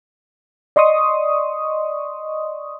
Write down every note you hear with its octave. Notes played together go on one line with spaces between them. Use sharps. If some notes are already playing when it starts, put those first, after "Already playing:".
D5 D#5 C6 C#6 D#6